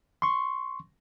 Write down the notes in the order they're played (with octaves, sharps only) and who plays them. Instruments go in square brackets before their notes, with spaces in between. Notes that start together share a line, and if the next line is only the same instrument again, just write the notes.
[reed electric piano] C6 C#6